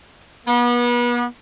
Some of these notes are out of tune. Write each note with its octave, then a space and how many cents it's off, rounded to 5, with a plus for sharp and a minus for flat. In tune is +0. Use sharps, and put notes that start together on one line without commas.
B3 -35